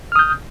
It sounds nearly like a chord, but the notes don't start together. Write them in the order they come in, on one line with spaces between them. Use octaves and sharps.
F6 D#6 G6